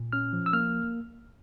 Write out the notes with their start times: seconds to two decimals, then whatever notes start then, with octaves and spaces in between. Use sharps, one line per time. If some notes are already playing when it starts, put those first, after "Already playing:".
Already playing: A#2
0.13 C#4 F6
0.33 F3
0.46 E6
0.53 A#3 F6